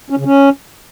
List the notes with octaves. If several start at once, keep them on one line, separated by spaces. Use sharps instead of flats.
C#4
C#3
C#4